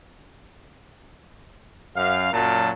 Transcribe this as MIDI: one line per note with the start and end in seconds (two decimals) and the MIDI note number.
1.97 2.30 42
1.97 2.30 77
2.32 2.72 42
2.32 2.72 46
2.32 2.72 54
2.32 2.72 70
2.32 2.72 81